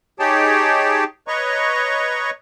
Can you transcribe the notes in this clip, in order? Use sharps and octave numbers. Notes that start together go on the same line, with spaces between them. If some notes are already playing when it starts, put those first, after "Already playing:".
D#4 G4 G#4 C#5 G5 A5
B4 C#5 D#5 A#5 C#6